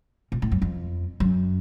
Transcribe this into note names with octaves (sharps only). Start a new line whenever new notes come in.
A#2
A2
F#2
F2
F#2